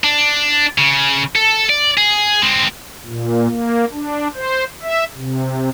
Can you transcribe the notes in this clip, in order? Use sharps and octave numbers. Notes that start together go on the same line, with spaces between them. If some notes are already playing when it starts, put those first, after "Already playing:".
D4
C#3
A4
D5
G#4
G#3 C4
A#2
A#3
D4
C5
E5
C3